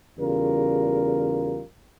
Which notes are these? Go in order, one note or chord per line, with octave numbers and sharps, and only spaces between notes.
E2 C#3 G3 F4 A#4